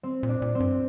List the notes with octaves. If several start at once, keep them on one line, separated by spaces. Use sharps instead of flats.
C4
A#2
D4
A#2
C4
G2